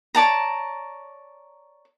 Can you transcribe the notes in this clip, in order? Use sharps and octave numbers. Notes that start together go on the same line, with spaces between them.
C#5 D5 A5 A#5